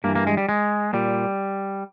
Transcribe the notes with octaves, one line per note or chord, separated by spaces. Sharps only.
G2 E3 A#3
A#3
G#3
G3
G#3
A#2 G3